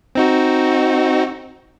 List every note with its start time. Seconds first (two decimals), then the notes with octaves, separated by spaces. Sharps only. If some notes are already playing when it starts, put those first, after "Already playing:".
0.15 C4 D#4 F#4